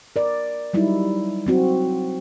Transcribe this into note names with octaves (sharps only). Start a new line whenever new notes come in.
A#4 D5
F#3 G3 D#4 E4
F#3 C4 F#4